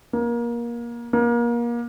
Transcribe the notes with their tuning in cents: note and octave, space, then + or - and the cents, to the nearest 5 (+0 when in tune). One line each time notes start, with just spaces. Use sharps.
A#3 +25
A#3 +30